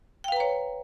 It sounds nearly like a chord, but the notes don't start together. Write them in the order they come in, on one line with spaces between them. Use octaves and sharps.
G5 F5 B4 A#5 C#5